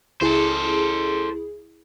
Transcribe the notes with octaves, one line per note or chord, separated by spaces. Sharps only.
C#2 E4 G#4 A4 C5